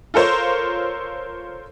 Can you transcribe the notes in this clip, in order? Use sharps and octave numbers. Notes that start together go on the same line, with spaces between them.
F4 A4 A#4 C5 C#5